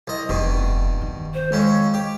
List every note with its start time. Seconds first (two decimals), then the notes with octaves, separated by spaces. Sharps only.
0.07 C2 D#5
0.29 F1 G2 B2
1.01 D#3
1.34 C5
1.52 F2 G#3 C#4
1.94 G4